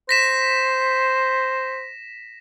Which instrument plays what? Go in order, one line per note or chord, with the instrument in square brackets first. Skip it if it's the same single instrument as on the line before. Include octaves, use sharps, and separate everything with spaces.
[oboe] C5 [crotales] A#6 B6 E7